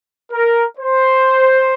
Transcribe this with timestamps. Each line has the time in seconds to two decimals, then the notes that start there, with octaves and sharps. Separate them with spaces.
0.33 A#4
0.79 C5